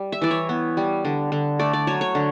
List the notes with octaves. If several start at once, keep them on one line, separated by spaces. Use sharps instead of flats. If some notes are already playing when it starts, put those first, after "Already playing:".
Already playing: G3
E5
E3 D5
C#5
B3
G3
D3
D3
A3 D5
D5
F#3 C#5
C#5
D3